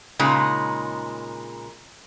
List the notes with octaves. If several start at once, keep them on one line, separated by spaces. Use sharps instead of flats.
A#2 C#3 G#3 D#4